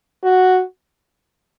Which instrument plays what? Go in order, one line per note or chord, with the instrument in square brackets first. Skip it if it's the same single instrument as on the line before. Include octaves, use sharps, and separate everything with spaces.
[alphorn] F#4